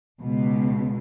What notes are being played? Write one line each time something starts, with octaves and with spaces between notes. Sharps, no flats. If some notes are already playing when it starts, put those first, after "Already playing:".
C#2 B2